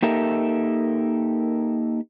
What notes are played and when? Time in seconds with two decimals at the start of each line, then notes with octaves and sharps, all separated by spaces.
0.03 A#3 D#4 G4 A4 A#4 E5